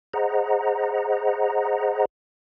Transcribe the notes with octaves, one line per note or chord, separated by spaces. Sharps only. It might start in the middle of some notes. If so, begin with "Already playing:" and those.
G#4 C5 D#5 F#5 A#5